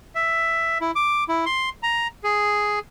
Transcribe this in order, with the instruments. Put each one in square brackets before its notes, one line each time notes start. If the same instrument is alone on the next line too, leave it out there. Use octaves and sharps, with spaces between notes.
[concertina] E5
E4
D6
E4
C6
A#5
G#4